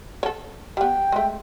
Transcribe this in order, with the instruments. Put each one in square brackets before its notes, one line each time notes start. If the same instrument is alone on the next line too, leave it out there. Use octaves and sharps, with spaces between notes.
[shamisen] A4 C#5
[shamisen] G3 B3 [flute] G5
[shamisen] G#3 A3